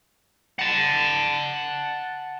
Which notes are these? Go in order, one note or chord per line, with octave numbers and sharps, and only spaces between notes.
F#5 A5